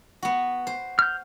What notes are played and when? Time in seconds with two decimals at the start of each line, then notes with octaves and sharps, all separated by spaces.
0.23 B3 F#4
0.67 C5
0.99 F6 G6